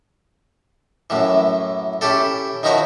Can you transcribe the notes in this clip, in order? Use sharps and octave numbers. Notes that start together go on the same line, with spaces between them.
F#2 A2 E3
C#4 E4 G4 A4
D#3 F3 D#4 E4 F#4 C#5